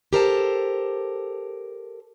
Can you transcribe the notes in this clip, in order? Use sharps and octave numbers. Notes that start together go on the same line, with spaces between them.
G4 A4 A#4 C5 F5 A5